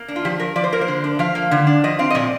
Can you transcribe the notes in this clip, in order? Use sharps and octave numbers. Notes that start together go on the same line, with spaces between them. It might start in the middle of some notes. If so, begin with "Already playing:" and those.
Already playing: A#3
D4
F4
F3 G4
F3 A#4
F3 D5
C5
A#3 A#4
C5
D3
D4
F3 F5
A#3
D3
D4
F3 D#5
C4 F5
D#5
A#2 D5